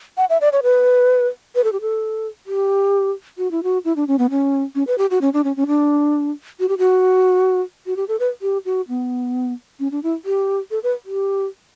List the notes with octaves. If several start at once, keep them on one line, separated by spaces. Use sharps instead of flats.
F#5
E5
D5
C#5
B4
B4
A4
G4
A4
G4
F#4
E4
F#4
E4
D4
C#4
B3
C#4
C#4
B4
G4
F#4
C#4
D4
C#4
C#4
D4
F#4
G4
F#4
F#4
G4
A4
B4
G4
F#4
B3
C#4
D4
E4
G4
A4
B4
G4